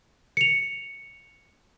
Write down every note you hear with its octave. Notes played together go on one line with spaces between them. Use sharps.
C#7 F7